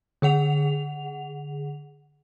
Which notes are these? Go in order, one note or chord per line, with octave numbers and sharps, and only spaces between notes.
D3 G#4 F#5 F7